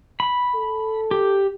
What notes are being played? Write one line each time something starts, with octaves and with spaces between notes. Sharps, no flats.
B5
A4
G4